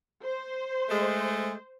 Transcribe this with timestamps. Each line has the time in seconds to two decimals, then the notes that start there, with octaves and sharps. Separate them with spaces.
0.23 C5
0.89 G#3 A3